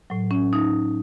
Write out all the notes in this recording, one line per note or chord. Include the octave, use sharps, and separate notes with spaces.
A2 F#3
C#4
D#4